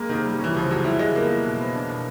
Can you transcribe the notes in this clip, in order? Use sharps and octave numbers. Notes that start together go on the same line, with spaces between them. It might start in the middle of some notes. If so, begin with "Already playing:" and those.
Already playing: G#3 A#3
C3 D#3
G3
C#4
E3
C#2 F3
F#3 G#3
G3 E4
C#3 G#3
A#3 B3
E4
B2
B3
D4
B2